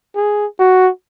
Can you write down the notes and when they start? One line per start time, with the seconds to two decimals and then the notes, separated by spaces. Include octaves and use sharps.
0.16 G#4
0.60 F#4